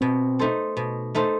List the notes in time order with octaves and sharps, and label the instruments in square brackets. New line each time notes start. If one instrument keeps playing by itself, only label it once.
[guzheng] B2 [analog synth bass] C4
[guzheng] A3 D#4 A4 C5
B2
A3 D#4 A4 C5